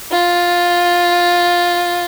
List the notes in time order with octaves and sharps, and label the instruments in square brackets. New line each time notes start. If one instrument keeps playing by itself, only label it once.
[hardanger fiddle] F4